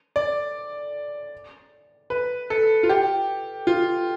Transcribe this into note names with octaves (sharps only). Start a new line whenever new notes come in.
D5
B4
A4
F4
G4
F4